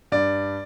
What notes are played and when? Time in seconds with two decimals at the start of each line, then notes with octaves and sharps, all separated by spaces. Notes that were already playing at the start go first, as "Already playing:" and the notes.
0.12 G2 D5